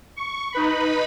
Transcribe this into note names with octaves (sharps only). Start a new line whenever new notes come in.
C#6
D#4 B4 B5